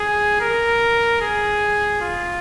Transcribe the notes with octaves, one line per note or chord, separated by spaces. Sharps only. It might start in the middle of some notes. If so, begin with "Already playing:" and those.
Already playing: G#4
A#4
G#4
F4